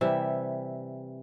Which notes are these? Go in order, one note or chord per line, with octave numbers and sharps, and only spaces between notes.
C3 E3 G3 E5